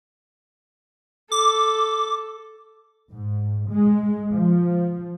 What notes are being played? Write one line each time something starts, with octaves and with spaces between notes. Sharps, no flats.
A4 D6
G#2
G#3
F3